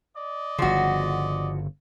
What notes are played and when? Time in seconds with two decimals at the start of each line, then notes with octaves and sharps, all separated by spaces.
0.16 D5 D#5
0.58 G1 C#3 F3 F#4